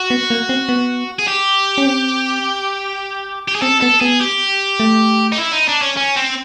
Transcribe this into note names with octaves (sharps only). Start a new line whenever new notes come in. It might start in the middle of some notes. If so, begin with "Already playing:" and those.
Already playing: F#4
B3
A#3
C4
B3
G#4
G4
C#4
C4
G4
G#4
C4 A4
B3 A4
B3 G#4
G4
A3
D#4
E4
D#4
D4
C#4
C#4
C4